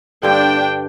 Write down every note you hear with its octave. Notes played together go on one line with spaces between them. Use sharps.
G2 D3 D4 G5